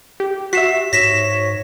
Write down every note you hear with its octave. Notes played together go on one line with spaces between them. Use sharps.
G4
F#4 E5 B6 C7 E7
G#2 C#5 A#6 B6 E7